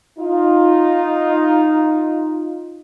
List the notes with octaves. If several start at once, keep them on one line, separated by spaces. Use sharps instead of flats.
D#4 F4